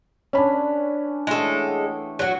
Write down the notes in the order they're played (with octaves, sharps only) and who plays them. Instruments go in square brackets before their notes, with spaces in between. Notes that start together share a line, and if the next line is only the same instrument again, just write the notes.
[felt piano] C#4 B5 [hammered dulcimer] D4 B4 C#5
[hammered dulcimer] E3 A3 F#5 [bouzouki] G#3 A4
[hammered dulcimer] G5
[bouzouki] F#3 F#4